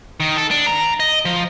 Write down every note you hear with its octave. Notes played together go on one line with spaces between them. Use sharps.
D#3
A4
D4
A#5
D#5
F3